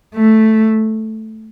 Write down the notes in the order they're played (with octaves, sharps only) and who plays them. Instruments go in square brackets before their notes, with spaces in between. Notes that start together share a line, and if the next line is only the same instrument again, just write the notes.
[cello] A3